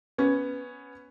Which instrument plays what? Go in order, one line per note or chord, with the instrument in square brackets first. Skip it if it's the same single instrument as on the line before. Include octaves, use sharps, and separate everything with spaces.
[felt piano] B3 C#4